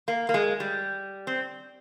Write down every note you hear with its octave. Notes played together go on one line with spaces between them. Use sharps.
A#3
A#3
G#3
G3
C4